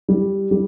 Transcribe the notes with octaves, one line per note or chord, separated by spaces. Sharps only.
G3
G3